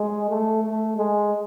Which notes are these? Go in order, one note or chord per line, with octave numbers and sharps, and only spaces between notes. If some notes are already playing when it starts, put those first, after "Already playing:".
Already playing: G#3
A3
A3
G#3